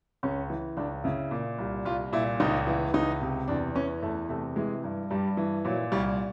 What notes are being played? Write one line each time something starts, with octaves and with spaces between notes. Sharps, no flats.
C#2 C#4
E3
C#2 D4
C#3 E4
A#2
C2
C2 F4
A#2 E4
C#2 D#4
E3
C#2 D#4
C3
E2 D4
E3 C#4
E2 A3
C3 A3
E3 G#3
G2
G2 G3
E3
A#2 F#3
C2 G3